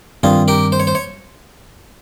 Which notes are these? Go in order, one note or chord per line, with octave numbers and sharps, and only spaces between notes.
G2 D#3 G3 C4 F4 G#4
G4 A#4
C5
C#5
C5
C#5